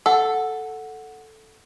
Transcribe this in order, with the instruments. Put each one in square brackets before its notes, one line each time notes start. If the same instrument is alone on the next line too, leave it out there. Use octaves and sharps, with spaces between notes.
[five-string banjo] A4 [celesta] F#5